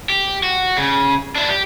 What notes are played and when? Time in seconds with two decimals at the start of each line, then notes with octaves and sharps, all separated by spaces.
0.10 G4
0.43 F#4
0.78 C#3
1.36 D4 E4
1.50 G4